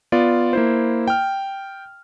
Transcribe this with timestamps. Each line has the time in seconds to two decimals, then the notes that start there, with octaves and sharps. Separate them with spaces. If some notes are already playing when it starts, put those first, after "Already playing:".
0.12 B3 F4 D5
0.53 A#3 E4 C5
1.08 G5 F6